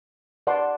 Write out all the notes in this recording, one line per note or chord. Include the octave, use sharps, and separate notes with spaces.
B4 D5 F#5 A5 C6